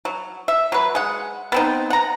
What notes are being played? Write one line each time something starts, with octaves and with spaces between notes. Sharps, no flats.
F#3
E5
F#3 B4
G#3 F#5
B3 C4 D#4
F#5 A#5